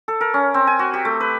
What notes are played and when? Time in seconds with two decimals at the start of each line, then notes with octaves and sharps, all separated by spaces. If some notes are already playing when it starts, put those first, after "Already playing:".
0.08 A4
0.21 A#4
0.34 C#4
0.54 C4
0.67 G#5
0.79 F#4
0.93 G4
1.05 A3
1.20 B4